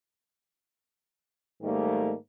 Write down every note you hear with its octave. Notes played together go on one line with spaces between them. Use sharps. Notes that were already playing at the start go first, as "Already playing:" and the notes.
G#2 D#3 G3 A3 A#3